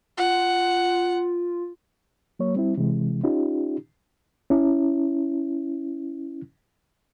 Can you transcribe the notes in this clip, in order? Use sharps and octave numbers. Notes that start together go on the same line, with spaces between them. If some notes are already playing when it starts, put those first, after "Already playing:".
F4 F#5
F#3 A#3 C#5
G3 C4 E4
C3 E3 G#3
C#4 D#4 F4 G4
C#4 E4